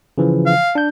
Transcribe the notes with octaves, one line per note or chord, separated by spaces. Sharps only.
C#3 E3 F3
F5
D4 G6